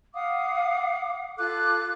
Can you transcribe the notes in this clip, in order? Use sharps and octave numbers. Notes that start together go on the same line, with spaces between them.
F5 F#5 D6 D#6
F4 A4 D6 F#6